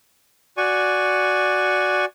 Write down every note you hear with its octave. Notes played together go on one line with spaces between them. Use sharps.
F#4 D5 G#5 C#6